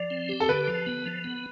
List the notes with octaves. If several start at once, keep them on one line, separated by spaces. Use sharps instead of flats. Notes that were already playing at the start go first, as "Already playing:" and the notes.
Already playing: F3 D5
C4
G4
A4
D3 B4
F3
B3
F3
B3